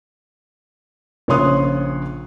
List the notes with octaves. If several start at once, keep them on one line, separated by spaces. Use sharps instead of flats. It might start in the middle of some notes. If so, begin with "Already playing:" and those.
A#1 C#3 C#5 C6 D#6 F#6